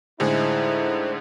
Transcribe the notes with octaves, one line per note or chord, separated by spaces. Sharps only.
A2 D3 G#3 D#4 E4 C5